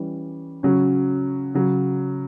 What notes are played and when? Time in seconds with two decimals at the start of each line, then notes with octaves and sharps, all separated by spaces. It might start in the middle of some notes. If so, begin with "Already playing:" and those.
Already playing: E3 G3 C#4
0.63 C#3 F#3 C#4
1.55 C#3 F#3